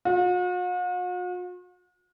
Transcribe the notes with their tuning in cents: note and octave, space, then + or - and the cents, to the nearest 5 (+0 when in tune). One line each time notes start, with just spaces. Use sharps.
F#4 -45